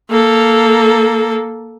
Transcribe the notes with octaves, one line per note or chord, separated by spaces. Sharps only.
A#3 A4